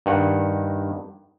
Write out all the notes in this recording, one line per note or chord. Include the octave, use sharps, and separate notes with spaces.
G2 D#3 F#5